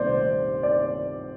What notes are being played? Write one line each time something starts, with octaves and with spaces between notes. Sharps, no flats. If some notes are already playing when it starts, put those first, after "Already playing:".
Already playing: C2 A#2 A3 C5 D5
D5